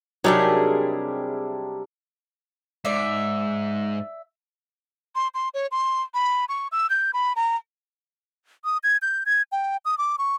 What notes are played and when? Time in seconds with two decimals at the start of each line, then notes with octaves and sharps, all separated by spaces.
0.24 C3 F#3 G3 D4 D#4 G#4 A#4 E5
2.85 G#2 D5 E5
5.15 C6
5.34 C6
5.54 C#5
5.71 C6
6.14 B5
6.49 C#6
6.72 E6
6.90 G6
7.14 B5
7.36 A#5
8.65 D#6
8.84 G#6
9.02 G6
9.26 G#6
9.52 G5
9.85 D#6
9.98 D6
10.18 C#6